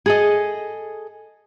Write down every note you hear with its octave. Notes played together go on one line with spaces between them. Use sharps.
G#4 A4 D#5